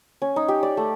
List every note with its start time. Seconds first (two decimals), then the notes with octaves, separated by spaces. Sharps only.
0.22 C#4
0.36 D#4
0.48 G4
0.63 D5
0.77 A3